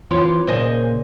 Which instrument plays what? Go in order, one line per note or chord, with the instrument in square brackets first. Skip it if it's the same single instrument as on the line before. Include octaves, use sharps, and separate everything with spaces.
[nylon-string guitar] E3 C4 F4 [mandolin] C#5 C6 D6
[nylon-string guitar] A#2 C#3 A#3 [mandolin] C5 D#5 G#5